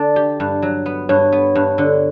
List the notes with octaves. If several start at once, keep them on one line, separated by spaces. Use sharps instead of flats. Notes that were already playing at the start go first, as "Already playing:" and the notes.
Already playing: D3 D4 D5
G4
G2
F#3
B3
G2 C#5
B3
G2
D3